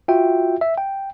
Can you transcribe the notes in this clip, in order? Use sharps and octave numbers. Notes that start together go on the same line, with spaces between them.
F4 F#4 E5 G5
E5
G5